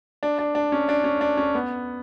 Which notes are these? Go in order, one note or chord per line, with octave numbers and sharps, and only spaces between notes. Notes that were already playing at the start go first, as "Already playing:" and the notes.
D4
D4
D4
C#4
D4
C#4
D4
C#4
B3